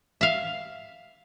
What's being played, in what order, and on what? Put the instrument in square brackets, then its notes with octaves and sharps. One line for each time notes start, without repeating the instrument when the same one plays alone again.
[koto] E5 F5